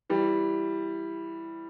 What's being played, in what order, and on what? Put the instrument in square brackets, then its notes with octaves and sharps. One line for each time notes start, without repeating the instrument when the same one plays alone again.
[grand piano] E3 G3